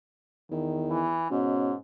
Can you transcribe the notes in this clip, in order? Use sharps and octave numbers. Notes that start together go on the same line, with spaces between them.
E2 D#3
E3
G#2 B2 C#4